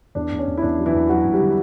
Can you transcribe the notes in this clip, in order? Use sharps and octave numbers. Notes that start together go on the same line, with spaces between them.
E2 D4
E2
C#4
E2
E4
E2 D4
F#3
E3 E4
E2
F#3 F#4
E2
G3 G4
D3